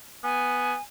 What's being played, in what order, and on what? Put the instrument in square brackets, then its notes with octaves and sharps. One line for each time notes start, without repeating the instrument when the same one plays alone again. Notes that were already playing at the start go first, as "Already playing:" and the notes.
[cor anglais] B3 [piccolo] G#5